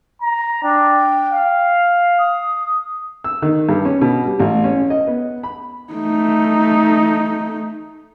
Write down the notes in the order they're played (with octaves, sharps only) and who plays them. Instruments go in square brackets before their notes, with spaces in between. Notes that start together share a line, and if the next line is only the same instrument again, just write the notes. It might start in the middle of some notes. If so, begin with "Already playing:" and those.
[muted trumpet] A#5
[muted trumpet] D4 [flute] G5
[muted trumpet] F5
[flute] D#6
[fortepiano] E6
D#3
G2
C#4
B2
G3
A1
C#4
D#5
B3
B5
[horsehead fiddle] A3 D#4